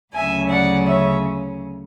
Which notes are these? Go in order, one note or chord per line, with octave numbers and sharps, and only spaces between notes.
D2 C#3 F#3 C#4 E5 G#5
D5 F#5
C#5 E5